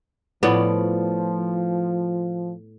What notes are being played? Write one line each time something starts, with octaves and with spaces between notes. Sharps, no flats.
A2 F3 B3 C#5 D5